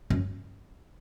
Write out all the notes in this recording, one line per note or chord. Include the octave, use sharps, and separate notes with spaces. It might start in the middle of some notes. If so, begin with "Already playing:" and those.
F#2